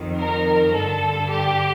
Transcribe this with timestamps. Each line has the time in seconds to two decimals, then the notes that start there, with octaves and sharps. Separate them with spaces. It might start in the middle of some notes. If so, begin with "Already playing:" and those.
Already playing: F2 D#3
0.19 A#4
0.74 G2 D3 A4
1.30 G4